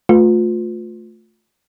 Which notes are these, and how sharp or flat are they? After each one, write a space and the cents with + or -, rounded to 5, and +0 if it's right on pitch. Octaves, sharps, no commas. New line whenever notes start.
A3 +0 F4 +25 B4 +20